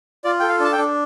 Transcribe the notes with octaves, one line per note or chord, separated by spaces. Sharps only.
F4 D5
A4 G5
F5
D4 A5
G5
D4